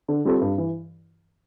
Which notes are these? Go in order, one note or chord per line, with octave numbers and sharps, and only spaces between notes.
D3
G3 C4 F4 A4
G2
E3